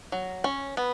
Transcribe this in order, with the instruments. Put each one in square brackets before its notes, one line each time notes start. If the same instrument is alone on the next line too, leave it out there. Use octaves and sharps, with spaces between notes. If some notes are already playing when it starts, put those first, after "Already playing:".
[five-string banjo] F#3
C#4
B3